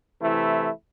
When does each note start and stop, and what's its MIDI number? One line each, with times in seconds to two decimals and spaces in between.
0.20 0.70 48
0.20 0.70 52
0.20 0.70 57
0.20 0.70 64